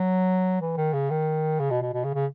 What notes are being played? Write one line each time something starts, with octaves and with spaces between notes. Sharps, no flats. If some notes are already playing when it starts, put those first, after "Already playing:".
Already playing: F#3
E3
D#3
C#3
D#3
C#3
B2
B2
B2
C#3
C#3